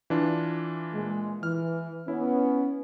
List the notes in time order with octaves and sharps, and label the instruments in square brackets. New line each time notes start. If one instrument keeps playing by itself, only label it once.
[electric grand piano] E3 D4 F4
[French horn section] A#2 G#3
[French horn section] E3 [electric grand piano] F6
[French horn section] B3 C#4 [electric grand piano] E4